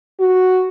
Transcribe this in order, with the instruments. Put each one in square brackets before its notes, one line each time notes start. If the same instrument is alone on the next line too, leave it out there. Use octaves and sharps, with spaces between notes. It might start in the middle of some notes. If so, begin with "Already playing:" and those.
[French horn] F#4